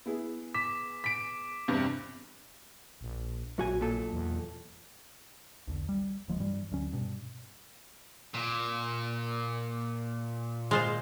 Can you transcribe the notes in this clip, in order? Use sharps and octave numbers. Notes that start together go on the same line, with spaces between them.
B3 E4 G#4
D6 B6
B6 D7
E2 G2 C3
A#1
A#1 F#2 F#4 G#5
B1 A#2 A4
E2
B1 E2 D3
G3
D1 F3 G3 G#3
G2 E3 G3
D2 F#3 C#4
G2 B2
A#2
G#3 F4 C5